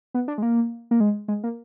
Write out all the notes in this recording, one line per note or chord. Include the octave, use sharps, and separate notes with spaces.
B3
D4
G#3
A#3
A#3
G#3
G#3
A#3